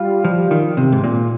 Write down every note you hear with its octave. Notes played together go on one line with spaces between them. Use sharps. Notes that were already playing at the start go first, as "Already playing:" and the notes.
Already playing: G3 F4
F3
D#3
C3
G#2
A#2